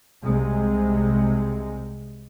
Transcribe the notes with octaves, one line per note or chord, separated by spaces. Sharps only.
C2 C3 G#3